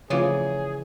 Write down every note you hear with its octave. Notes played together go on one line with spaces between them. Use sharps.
C#3 E3 F3 A3 F4 G#4 C#5 D5